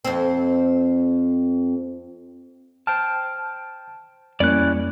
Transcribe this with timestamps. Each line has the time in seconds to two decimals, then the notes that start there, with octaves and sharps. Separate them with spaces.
0.05 F2 C4
2.87 C5 G5 A5 F6
4.40 F2 G3 A#3 C#4 E4 D5 F#6